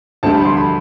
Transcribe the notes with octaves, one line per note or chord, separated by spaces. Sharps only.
D2 D3 G3 A5
B5
C6
B5